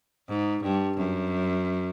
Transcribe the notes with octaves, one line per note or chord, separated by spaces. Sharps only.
G#2
G2
F#2